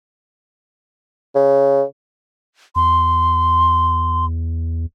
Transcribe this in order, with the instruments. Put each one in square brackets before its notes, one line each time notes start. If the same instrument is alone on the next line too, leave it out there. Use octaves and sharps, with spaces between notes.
[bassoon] C#3
[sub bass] E2 [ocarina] C6